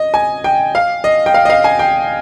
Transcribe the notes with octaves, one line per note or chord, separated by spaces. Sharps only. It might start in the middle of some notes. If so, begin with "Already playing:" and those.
Already playing: D#5
G#5
G5
F5
D#5
G5
F5
D#5
F5
G#5
G5